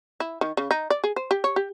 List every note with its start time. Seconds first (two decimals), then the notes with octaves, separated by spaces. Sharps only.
0.20 E4
0.41 D#3
0.57 C#3
0.71 D#4
0.90 D5
1.04 G#4
1.16 C5
1.31 G4
1.44 C#5
1.56 G4